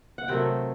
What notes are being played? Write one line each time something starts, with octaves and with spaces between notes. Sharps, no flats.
F#5
C3 D#3 F#3 A3 G5